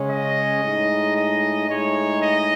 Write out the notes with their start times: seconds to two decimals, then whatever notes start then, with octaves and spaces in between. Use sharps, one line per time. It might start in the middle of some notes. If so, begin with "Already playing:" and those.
Already playing: C#3 G#3 C#4
0.10 D#5
0.62 A2 G#3 D#4
1.16 D#5
1.69 A2 G#3 D#4 C#5
2.22 D#5